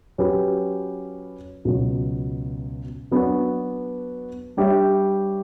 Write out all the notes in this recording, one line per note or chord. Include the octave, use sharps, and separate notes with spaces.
F#3 C#4 G4 B4
C#2 B2 F#3
F#3 B3 D4 F#4 B4
G3 D4 G4 C#5 E5